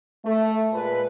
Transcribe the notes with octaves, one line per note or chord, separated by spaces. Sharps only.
A3
A#2 G#3 B4